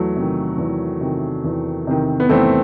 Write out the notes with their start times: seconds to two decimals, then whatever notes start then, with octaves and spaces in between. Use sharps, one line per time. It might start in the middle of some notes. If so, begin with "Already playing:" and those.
Already playing: E2 F#3 A3
0.16 C3 D#3
0.58 E2
1.01 C3 D#3
1.44 E2
1.87 C3 D#3
2.20 B3
2.29 E2 A3 C4